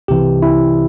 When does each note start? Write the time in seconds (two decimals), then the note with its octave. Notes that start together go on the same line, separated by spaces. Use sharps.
0.08 C2 C3 E3 G4
0.42 E4